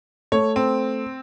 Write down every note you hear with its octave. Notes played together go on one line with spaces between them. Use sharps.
A3 C#5
C4